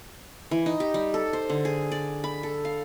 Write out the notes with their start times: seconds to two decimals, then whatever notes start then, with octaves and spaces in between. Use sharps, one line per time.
0.51 E3
0.66 D#4
0.80 G4
0.94 G3
1.14 A4
1.33 C5
1.50 D3
1.65 G#4
1.92 D5
2.24 B5
2.43 A4
2.65 F5